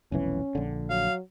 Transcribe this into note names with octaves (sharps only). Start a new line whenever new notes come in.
F1 B1 E3 C#4
A#1 D3
F#3 F5